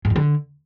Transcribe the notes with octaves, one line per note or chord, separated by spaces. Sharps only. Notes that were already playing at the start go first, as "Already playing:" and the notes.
G#2
F2
D3